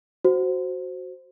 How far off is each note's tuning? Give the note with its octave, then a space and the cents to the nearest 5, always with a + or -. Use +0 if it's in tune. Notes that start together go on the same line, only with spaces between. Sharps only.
F#4 +0 C5 +0